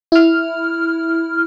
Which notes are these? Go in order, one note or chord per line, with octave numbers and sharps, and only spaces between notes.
E4 F6